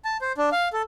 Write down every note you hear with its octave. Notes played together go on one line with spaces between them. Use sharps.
A5
C5
D4
F5
A4